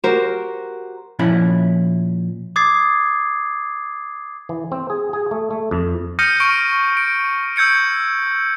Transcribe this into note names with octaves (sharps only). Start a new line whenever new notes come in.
F#4 G4 A#4 C5
A#2 F3 C#4 E4 B5
D6 D#6 G#6 A6 C7
E3
C4
G#4
G#4
A3
A3
F2
D#6 F6 G6 A#6 C#7 D#7
C#6 F6 D7 D#7
D7
E6 G6 G#6 C#7 D7